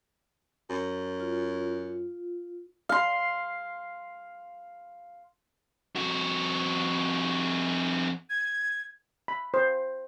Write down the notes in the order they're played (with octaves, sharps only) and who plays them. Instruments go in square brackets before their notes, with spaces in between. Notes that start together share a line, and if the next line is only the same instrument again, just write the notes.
[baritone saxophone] F#2
[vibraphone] F4
[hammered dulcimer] F5 C6
[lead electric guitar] F2 F#4
[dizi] G#6
[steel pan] B5
C5